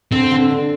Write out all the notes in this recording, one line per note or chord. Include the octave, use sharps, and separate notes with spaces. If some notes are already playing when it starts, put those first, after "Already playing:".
D3 C4
D3
D4